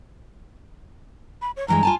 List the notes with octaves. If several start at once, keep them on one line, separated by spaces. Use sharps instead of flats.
B5
C#5
G2 E3 G#3 A#5
F4 G#5 A5